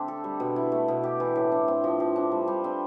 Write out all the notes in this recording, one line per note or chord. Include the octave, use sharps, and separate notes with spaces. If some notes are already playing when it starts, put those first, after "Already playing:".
Already playing: D3 A3 C4 D4 G4
A4
G3
B2
E4
A3
B2
G4
E3
A2
D4
C4
F3
F3
D4
G3
G3
C4